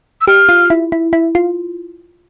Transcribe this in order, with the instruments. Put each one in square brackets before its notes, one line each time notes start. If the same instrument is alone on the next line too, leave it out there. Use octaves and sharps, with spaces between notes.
[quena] E6
[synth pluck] G4 [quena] F6
[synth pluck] F4
E4
E4
E4
F4